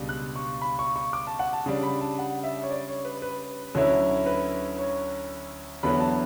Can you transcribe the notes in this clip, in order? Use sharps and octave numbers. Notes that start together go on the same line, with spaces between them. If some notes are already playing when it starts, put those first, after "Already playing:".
Already playing: C#2 B2 G3 D4
F#6
C#6
B5
C#6
C#6
D6
A5
F#5
A5
C#3 G3 D4
B5
A5
F#5
E5
C#5
D5
C#5
B4
B4
D2 D3 F#3 C#4 E4
B4
C#5
E2 D3 F#3 B3 E4 B5
A5